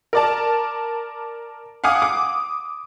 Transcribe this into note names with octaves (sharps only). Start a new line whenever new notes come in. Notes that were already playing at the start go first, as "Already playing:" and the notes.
A#4 D5 A5
F5 F#5 G#5 D6 D#6
D6